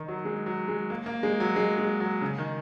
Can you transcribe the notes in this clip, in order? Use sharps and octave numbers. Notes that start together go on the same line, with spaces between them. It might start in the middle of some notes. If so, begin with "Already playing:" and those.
Already playing: D#3
F#3
G#3
F#3
G#3
A#3
A#3
G#3
F#3
G#3
G#3
F#3
C#3
D#3